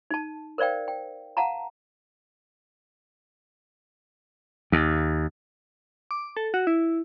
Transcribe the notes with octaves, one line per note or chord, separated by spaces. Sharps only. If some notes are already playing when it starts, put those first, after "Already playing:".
D#4 A5
A#4 C5 D5 F5 G5
G5
F5 F#5 A5 A#5
D#2
D6
A4
F#4
E4